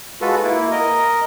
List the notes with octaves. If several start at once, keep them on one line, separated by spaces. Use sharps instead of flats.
G#3 F4 F#4 A4 B4
A#3 E4
A#4 D#5